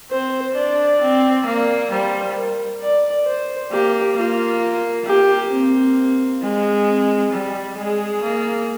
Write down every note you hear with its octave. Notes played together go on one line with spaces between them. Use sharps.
C4 C5
D4 D5
C4
A#3
G3 C5
A#4
D5
C5
A#3 G4
A#3 F4
A#3 G4
C4
G#3
C4
G3
G#3 G#4
A#3